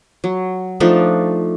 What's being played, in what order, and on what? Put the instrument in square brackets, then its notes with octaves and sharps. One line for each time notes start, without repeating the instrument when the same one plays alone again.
[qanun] F#3
F3 A3 D4 D#4